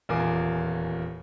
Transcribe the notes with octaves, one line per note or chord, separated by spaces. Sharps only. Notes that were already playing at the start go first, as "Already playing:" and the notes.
D#1 E2 F4 A#4 G#5 D6